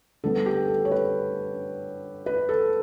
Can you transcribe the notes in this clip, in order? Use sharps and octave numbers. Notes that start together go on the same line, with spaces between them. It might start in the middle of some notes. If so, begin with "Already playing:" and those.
D3 G3 B3 A4
G4
A4
C#5
B4
B4
A4